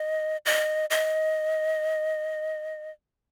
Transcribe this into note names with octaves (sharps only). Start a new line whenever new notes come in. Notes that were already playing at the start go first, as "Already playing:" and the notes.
Already playing: D#5
D#5
D#5